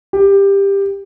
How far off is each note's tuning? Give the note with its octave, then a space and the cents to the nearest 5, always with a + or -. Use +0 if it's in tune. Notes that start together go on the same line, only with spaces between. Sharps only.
G4 +15